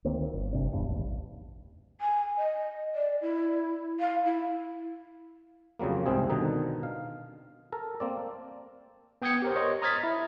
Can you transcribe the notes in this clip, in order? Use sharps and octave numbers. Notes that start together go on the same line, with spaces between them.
D2 D#3 A#3 C4
G1
F#1 C3 D4
D#1 E2 G2
A1 D#2
G#5
D#5
D5
E4
F5
E4
F2 C#3 F#3 G3 A#3
C2 G#2 C3 C4 G#4
B2 D3 D#3 D#4
F5
A4 A#4
A#3 C4 D5
B3 G5 D#6 G6 G#6 C#7
G4 A#4 C5
C#5 D#5 C6
A#5 D#6 F6 G#6 A6 B6
E4